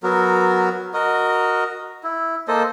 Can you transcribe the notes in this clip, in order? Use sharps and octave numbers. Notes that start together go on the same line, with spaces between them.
F#3 B3 F#4 A#4
F#4 A#4 D#5
E4
A#3 A4 C5 D#5